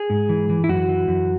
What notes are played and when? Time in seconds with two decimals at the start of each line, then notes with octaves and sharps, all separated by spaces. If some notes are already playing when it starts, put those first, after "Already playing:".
Already playing: G#4
0.10 G#2
0.29 E3
0.49 E3
0.64 E4
0.69 F#2 F#4
0.89 E3
1.08 F#2